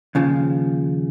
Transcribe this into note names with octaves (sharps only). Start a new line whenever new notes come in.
D#2 C#3 F3